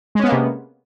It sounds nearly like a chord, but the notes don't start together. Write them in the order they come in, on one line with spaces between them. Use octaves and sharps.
G#3 C#4 B3 A#3 C3